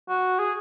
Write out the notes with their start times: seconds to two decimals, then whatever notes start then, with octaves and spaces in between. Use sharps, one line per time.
0.09 F#4
0.39 G#4